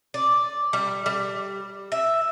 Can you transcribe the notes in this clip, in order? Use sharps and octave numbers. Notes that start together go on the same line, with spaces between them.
D5
G3
G3
E5